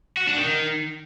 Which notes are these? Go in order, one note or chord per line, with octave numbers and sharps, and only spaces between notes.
F#4
D4
D#3